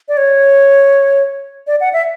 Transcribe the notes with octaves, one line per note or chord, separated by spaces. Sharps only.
D5
C#5
D5
F#5
E5